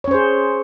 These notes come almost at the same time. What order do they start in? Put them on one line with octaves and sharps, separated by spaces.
C#5 C#4 C5 G#4